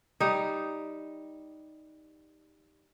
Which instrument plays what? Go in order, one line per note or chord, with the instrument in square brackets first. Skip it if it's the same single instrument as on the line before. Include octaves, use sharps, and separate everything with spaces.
[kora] G3 D#4